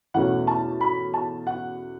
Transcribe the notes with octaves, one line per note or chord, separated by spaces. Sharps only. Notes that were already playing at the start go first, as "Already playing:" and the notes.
E2 B2 A3 C#4 F#5
A5
B5
A5
F#5